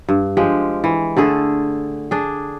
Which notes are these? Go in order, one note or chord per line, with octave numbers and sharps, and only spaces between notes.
G2
F3 G#3 G4
E3
D3 A3 G#4 A4
D4 G#4